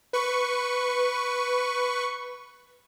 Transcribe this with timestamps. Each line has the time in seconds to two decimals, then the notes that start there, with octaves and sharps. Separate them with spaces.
0.13 B4 C#6